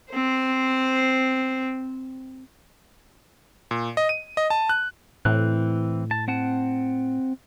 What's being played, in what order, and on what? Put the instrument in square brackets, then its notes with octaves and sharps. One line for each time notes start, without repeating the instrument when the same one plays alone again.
[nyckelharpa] C4 C5
[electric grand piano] A#2
D#5
D#7
D#5
A5
F#6
[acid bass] A2 [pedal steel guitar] E3 C4 F#6
[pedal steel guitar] A5
C4 F#5 A5